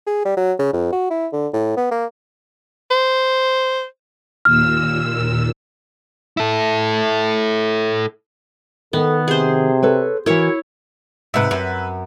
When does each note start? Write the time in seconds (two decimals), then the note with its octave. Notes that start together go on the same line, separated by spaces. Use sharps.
0.07 G#4
0.25 G3
0.37 F#3
0.59 C#3
0.73 F2
0.93 F#4
1.10 E4
1.33 D3
1.54 A2
1.77 B3
1.91 A#3
2.91 C5
4.45 D#2 A#2 E6 F6
6.37 E4 A4
8.93 D#3 B3 A4 F#5
9.28 C3 G#4 C5
9.83 A4 B4 C#5
10.26 E3 E4 F#4 A#4 C#5
11.34 G#2 C3 B4 E5
11.51 F#2